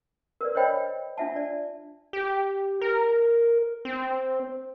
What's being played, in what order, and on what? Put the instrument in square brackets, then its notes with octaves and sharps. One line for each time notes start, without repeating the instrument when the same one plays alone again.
[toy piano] A#4 B4 D5
C5 C#5 D#5 G5 B5
D4 F4 E5 F#5 A5
D5
[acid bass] G4
A#4
C4